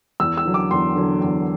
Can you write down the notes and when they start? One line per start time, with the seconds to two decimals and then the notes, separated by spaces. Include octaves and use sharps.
0.20 E2 E6
0.37 E6
0.45 D3 F#3
0.54 D6
0.71 E2 C6
0.96 D3 F#3
1.21 E2